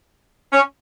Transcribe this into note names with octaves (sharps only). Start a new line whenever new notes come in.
C#4